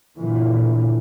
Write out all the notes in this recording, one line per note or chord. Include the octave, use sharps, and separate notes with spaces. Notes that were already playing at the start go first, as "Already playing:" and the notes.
A#2 D3 E3